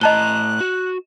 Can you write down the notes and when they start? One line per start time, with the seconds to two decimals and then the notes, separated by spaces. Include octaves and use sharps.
0.01 A2 D#5 A5 A#5 F#6 G7
0.61 F#4